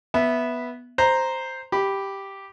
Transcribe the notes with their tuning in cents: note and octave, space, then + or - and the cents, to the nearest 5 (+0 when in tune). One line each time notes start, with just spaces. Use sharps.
B3 -5 E5 +0
C5 +0 A#5 +0
G4 +0 B5 +0